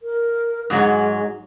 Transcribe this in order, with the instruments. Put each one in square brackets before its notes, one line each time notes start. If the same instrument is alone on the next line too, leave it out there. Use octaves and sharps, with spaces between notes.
[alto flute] A#4
[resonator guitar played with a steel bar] G#2 F#3 [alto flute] G#3